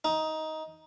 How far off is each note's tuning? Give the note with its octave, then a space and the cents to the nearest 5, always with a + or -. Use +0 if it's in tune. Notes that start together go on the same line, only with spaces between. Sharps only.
D#4 +15